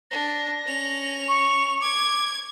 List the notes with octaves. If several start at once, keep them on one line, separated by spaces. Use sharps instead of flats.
D4 A#6
C#4 F7
C#6
D6 G#6